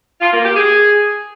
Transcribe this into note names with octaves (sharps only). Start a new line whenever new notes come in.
F4
A#3
G4
G#4